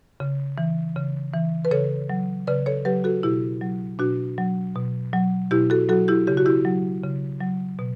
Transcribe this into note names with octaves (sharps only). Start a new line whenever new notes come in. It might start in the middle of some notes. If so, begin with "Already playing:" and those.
C#3
E3
C#3
E3
B4
C#3 A4 C#5
F#3
C#3 B4 D5
A4 C#5
F#3 G4 B4
F#4 A4
B2 E4 G4
F#3
B2 D4 F#4
F#3
B2
F#3
B2 E4 G4
F#4 A4
F#3 F#4 A4
E4 G4
C#3 G4
F#4
E4 G4
F#3
C#3
F#3
B2